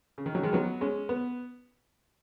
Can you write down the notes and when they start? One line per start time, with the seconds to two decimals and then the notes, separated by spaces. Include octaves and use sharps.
0.18 C#3
0.26 D#3
0.35 C#3 F#3
0.43 D#3 G#3
0.53 F#3 B3
0.81 G#3 C#4
1.09 B3